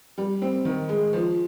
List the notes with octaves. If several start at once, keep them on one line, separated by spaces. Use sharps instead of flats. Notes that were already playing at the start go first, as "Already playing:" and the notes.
G3
C4
D#3
G#3
F3